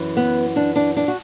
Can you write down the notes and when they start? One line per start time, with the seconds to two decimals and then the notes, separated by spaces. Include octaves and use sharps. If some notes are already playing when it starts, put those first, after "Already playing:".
Already playing: F#2 E3
0.17 B3
0.56 D4
0.76 D4
0.97 D4
1.08 F#4